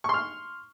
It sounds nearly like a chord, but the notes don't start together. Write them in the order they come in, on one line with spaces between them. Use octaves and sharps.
C#6 C6 F6